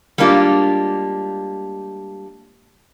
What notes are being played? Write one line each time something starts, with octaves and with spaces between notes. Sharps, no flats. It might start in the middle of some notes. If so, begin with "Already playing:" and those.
G3 G#3 A#3 D4 F4 G4